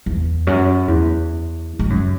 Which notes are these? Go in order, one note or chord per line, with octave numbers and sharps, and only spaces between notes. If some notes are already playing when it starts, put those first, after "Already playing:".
E2
F#2
E2
G#2
F#2